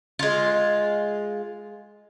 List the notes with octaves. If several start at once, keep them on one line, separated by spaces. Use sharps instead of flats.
G#3 F4